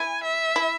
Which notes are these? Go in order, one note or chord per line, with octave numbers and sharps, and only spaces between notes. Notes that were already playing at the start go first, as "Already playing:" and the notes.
Already playing: E4 G#5
E5
E4